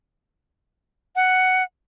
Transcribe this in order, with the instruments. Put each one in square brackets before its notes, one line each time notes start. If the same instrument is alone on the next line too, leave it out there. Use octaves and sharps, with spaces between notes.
[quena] F#5